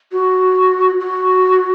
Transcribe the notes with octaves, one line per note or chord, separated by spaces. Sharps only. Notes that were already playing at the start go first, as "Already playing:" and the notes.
F#4
F#4